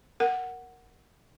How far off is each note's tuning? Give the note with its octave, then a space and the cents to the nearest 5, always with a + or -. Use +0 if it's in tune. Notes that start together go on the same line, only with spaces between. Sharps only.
A#4 +0 F#5 +0